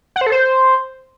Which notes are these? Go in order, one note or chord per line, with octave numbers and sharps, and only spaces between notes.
F#5
C5
A4
C5